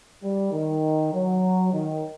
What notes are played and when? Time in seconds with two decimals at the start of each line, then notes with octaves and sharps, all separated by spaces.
0.23 G3
0.53 D#3
1.13 F#3
1.73 D#3